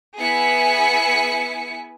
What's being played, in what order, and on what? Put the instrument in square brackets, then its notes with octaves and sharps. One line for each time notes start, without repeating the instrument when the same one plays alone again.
[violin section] B3 E4 G#4 G#5 B6 C#7